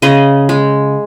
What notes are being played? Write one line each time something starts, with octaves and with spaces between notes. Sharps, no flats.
C#3 D#5
G#3